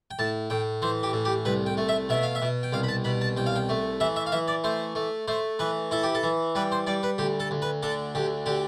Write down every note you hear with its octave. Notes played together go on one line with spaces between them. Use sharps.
G5
A2 A5
A2 G5
E3 C5
G4
A2
G4
C2 B4
G5
A3
E5
B2 E5
F5
E5
B2
G5
C2 F5
B5
A5
B2 B5
A5
C2 G5
F5
G5
A3
E3 E5
E5
F5
E3 E5
D5
A3 C5
A3
A3 C5
E3 B4
E4 A4
G4
A4
E3
G3 B4
C5
G3 D5
B4
D2 G4
A4
D2
B4
D3 A4
D2 G4
D3 G4